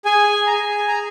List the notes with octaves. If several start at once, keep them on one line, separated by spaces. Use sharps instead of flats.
G#4 G#5
A#5
G#4 G#5
A#5